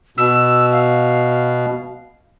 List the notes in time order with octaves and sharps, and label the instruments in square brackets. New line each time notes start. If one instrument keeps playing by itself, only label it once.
[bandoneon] B2 [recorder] E6
[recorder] F5